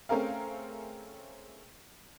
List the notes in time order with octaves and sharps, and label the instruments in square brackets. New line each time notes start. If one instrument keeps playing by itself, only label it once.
[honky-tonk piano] A3 C4 C#4 G#4 A#4 F5